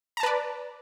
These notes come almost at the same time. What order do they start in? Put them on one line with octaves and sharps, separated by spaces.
A#5 A5 B4 D5